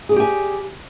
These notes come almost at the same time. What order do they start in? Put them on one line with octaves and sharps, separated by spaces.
G#4 D5 G4 G#5